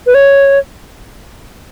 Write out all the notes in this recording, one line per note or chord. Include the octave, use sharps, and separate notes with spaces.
B4
C#5